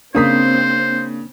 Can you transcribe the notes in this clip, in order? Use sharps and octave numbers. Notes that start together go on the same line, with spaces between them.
C#3 A#3 C4 D4 C5 D#6 B6